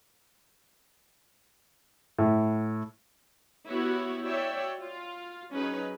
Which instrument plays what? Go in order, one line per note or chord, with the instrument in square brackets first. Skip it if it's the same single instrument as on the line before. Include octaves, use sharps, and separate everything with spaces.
[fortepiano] A2
[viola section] B3 E4 F#4 G4 C#5
F#4 C#5 D5 E5 G5
F4
F#3 C#4 D#4 G#4 B4